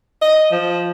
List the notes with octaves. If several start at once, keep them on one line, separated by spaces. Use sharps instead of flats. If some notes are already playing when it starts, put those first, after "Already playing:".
D#5
F3